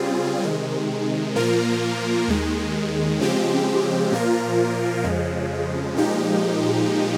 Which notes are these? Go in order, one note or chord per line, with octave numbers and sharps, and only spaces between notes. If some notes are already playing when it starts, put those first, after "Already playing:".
Already playing: C#3 G3 C4 F4 G#4
C3 D#3 G#3
A#2 F3 A#3 F4 A#4
D#2 D#3 G#3
C#3 F3 G#3 C4 G4
A#2 F3 A#3 F4 A#4
F2 C#3 F3 G#3
A#2 F3 G#3 D#4 G4